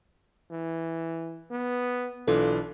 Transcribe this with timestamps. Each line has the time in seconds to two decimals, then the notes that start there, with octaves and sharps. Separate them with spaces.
0.50 E3
1.51 B3
2.28 B1 E3 D4 F4 A4